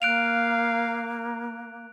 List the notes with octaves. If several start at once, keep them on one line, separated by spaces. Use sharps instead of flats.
A#3 F5 F#6 D7 F7